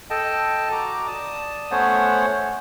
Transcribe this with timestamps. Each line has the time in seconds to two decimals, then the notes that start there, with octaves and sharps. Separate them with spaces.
0.10 A4 D#5 G5 A5
0.72 F#4 A#5 D6
1.07 D5 A5 D#6
1.71 A3 B3 C#4 C5 C#5 F#5